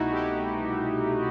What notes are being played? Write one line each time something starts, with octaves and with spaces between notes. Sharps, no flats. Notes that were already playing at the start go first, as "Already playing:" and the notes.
Already playing: C2 B2 A3 D#4 E4 F#4
C2 E4 G4
B2 A3